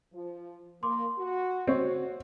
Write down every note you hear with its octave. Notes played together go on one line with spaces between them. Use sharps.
F3
A#3 C6 D6
F#4
C4 F#4 C#5